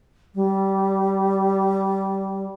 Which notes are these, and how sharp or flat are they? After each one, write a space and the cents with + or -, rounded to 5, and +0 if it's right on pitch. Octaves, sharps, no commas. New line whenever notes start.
G3 -20